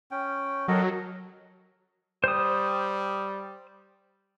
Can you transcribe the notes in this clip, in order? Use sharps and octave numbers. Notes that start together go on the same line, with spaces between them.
C#4 G5
F#3 A4 A#4 D#5
G3 C5 D#6